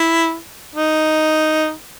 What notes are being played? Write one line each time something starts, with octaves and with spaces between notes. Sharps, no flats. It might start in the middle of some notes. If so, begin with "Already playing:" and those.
Already playing: E4
D#4